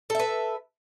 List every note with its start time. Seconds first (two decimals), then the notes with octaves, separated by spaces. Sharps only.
0.10 A4
0.15 E5
0.19 B4